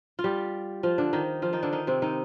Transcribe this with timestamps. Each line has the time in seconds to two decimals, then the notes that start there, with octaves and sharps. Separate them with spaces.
0.19 F4
0.24 G3 G4
0.83 F3 F4
0.98 D3 D4
1.13 D#3 D#4
1.42 F3 F4
1.53 D#3 D#4
1.63 D3 D4
1.72 D#3 D#4
1.87 C3 C4
2.02 D#3 D#4